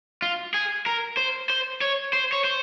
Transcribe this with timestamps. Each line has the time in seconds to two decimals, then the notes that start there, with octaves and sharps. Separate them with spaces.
0.22 F4
0.54 G#4
0.86 A#4
1.17 C5
1.50 C5
1.81 C#5
2.13 C5
2.33 C#5
2.44 C5